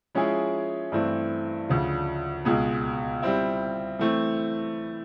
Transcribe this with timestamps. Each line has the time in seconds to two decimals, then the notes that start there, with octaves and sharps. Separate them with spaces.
0.15 F3 G#3 C#4 E4 G#4
0.92 G2 E3 A3 C4
1.69 D2 C#3 F3
2.45 C#2 B2 G#3
3.22 G3 C4 E4
3.99 E3 A3 C4